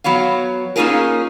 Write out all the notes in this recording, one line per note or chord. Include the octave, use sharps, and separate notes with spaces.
F#3 B3 C#5 F5
A#3 C#4 D#4 F4 G#4 A#4